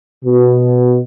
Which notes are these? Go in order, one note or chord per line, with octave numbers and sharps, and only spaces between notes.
B2